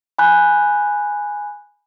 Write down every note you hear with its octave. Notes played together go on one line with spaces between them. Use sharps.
G#5 B5 F#6 G6